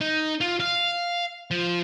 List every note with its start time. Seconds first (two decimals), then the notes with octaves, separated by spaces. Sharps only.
0.01 D#4
0.41 F4
0.60 F5
1.51 F3